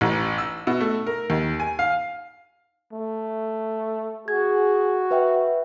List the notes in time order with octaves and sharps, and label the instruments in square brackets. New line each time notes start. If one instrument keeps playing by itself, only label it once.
[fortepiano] A1
E6
B2
A3
A#4
D#2
G#5
F5
[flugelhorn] A3
[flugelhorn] F#4 [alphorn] G#4 [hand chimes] G#6
[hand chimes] B4 E5 G5